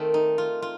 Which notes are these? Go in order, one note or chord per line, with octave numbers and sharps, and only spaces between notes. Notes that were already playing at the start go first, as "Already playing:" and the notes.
Already playing: D#3 A3 C4
D#4
F4
F4